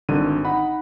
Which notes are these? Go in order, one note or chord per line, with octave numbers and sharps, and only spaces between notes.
G#1 D3 D#3 G3 D#7
D#4 F#5 B5